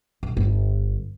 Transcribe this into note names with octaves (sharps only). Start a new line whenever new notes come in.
B1
G1